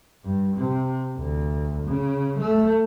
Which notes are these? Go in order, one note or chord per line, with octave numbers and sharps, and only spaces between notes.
G2
C3
D2
C#3
A3